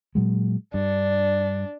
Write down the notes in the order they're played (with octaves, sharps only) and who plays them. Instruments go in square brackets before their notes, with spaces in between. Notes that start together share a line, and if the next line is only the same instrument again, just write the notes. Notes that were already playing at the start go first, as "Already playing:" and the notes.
[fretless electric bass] A#2 F#3 G#3
[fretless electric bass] G2 [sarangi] D4